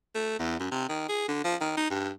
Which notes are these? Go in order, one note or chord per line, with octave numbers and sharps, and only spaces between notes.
A3
E2
F#2
C3
D#3
G#4
D3
F3
D#3
D#4
G2